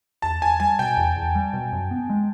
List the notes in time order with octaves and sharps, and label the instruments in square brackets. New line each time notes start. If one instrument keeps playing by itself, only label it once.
[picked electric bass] E2 [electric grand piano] A5
[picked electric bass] E2 [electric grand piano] G#5
[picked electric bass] G3 [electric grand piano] G#5
[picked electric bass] B2 [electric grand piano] G5
[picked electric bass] E2
E2
G3
B2
F#2
B3
G#3